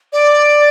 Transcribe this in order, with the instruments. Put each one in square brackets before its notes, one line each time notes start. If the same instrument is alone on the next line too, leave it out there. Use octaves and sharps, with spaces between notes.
[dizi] D5